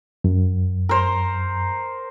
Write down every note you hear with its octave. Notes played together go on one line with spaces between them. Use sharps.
F#2
A#4 C5